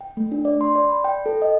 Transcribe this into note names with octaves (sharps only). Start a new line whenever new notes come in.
G5
A3
D4
D5
C6
D5
B5
G5
A4
D#5